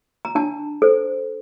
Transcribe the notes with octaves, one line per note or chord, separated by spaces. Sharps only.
A#5
D4 A5
A4 C5